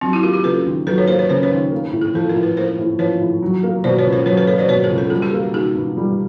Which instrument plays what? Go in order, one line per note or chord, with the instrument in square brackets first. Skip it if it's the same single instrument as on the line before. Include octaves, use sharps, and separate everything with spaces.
[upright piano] F#3 [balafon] C4 D4
[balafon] E4 F#4
[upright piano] A#3 [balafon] F4 G4
[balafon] F4 G4
[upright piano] C#3 [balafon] A4 B4
[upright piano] D#2
[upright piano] F#3 [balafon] A4 B4
[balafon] B4 C#5
[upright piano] A#3 [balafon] A#4 C5
[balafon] B4 C#5
[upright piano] C#3 [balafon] A#4 C5
[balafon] B4 C#5
[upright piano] D#2
A#3
A2
[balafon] G#4
[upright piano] F3 [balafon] A4
[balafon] A#4
[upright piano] A2
[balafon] B4
[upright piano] A#3 [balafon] A#4 C5
[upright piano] A2
[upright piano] F3 [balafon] B4 C#5
[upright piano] A2
F#3
A#3
[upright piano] B2 [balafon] C5 D5
[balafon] B4 C#5
[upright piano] C#2
[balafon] A#4 C5
[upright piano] F#3 [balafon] B4 C#5
[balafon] A4 B4
[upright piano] A#3 [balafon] B4 C#5
[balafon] C5 D5
[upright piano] B2 [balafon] B4 C#5
[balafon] G#4 A#4
[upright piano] C#2
[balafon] A4
[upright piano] G3 [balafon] G#4
[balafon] G4 A4
[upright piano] A#3
[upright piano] D#3 [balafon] F#4 G#4
[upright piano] G2
G3